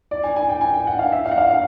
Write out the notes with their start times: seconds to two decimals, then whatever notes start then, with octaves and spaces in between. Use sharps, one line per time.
0.11 D5
0.23 G#5
0.36 G#5
0.49 G5
0.61 G#5
0.74 G5
0.87 F#5
0.99 F5
1.12 E5
1.26 F5
1.31 F#5
1.38 F5
1.51 F5